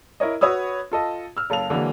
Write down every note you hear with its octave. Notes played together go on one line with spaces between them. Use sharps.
E4 A#4 C#5 D#5
F#4 B4 C#5 B5 D#6 E6
F4 A4 D#5
E6 F6
F#1 A4 F5 F7
D3 E3 F#3 G#3 A#3